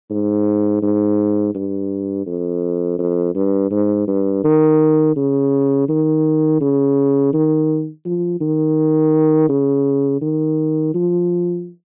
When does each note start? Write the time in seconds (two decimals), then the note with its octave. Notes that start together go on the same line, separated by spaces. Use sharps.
0.10 G#2
0.82 G#2
1.54 G2
2.26 F2
2.99 F2
3.35 G2
3.71 G#2
4.08 G2
4.44 D#3
5.16 C#3
5.88 D#3
6.61 C#3
7.33 D#3
8.05 F3
8.41 D#3
9.49 C#3
10.21 D#3
10.94 F3